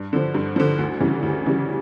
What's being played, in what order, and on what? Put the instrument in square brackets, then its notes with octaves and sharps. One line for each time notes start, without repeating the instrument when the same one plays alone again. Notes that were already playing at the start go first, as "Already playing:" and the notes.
Already playing: [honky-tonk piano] G2
D3 F3
G2
D3 F3
D2
C#3 E3 G3
D2
C#3 E3 G3